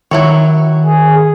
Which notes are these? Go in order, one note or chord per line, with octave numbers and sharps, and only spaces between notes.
D#3 F#3 E4 C#5
G#4